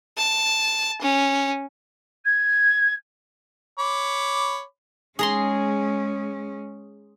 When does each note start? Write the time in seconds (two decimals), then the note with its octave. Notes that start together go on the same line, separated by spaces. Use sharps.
0.18 A5
1.02 C#4
2.24 G#6
3.79 C#5 B5 D6
5.19 G#3 C#4 G#4 A#5 C6